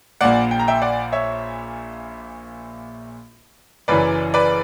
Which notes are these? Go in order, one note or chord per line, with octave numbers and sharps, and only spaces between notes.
A#1 A#2 A#3 D5 F#5
G5
A#5
E5 G5
D5 F#5
C#5 E5
F#1 F#2 E3 B4 D5
B4 D5